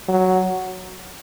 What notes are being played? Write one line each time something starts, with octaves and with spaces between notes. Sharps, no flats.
F#3